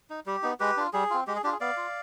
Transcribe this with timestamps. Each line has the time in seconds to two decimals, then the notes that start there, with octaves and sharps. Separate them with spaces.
0.10 D#4
0.26 G3 G4
0.43 B3 D#4
0.60 G#3 G4 B4
0.77 D4 F4
0.93 G3 G#4
1.10 C4 F4
1.27 G#3 G4
1.36 G#4
1.44 D4 F4 G4
1.52 G#4
1.60 B3 D5 F5
1.77 F4